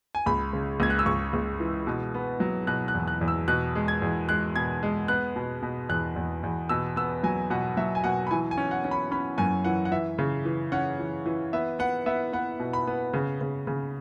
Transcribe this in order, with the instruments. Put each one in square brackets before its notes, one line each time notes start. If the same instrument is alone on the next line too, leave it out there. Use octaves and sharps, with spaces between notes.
[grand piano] G#5
C#2 B5
C#3
C#2 G#6
F#6
E6
C#2 C#6
C#2
E3
B2
B3
F#3
B2 F#6
F#6
E2
F#6
E2
E6
B2 F#6
G#3
G#6
E2
G#3 F#6
B2 G#6
G#3
B3 F#6
B2
B2
E2 F#6
E2
E2
B2 E6
B3 E6
F#3 G#5
B2 F#5
F#3 E5
G#5
B2 F#5
B5
E3 G#5
G#5
C#4
F#5
C#4
B5
C#4 B5
F#2 G#5
E3 F#5
F#5
E3 E5
C#3
E3
C#4 F#5
E3
E3
B3 E5
B3 F#5
B3 E5
B3 F#5
B2
B5
B3
C#3
C#3
C#3